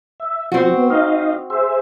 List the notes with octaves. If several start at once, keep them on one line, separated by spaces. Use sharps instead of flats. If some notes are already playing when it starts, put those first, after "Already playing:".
E5
F3 C4 F#4
B3
D#4 D#5 F5
G#4 C5 E5